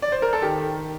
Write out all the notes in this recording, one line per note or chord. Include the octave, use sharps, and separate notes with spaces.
D5
C5
A#4
A4
D#3 G4